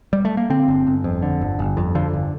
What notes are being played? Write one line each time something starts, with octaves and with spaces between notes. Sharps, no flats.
G3
A3
A#3
D3 C4
G1
G1
F2
D3
G1
G1
F2
D3 F3
G1